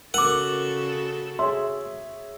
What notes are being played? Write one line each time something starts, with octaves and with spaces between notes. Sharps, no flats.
C#3 F#4 A4 A#4 F#5 D6
G#4 C#5 E5 C6